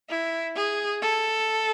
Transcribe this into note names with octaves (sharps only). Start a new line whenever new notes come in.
E4
G#4
A4